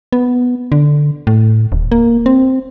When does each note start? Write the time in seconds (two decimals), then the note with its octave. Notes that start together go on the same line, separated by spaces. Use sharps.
0.13 B3
0.72 D3
1.27 A2
1.72 D#1
1.92 A#3
2.26 C4